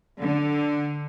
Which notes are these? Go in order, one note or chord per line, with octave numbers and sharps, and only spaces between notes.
D3